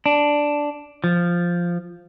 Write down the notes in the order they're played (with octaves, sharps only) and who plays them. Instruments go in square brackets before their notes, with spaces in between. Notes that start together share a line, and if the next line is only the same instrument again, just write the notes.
[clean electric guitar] D4
F3